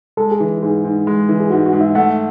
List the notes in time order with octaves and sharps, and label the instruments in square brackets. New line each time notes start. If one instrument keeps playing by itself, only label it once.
[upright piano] G#3 [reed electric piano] A4
[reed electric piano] G#4
[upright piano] E3
[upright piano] G#2 [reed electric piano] G#4
[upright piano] G#2
G#3
E3
[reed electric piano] G#4
[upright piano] G#2 [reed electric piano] F#4
[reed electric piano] F#4
[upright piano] G#2
[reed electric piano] E5
[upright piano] A3 [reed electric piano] F#5